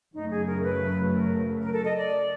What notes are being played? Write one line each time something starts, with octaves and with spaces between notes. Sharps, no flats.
F#2 C#3 F#3 A3 D#4
G#4
A#4
B4
A#4
A#4
A4
D#5
D5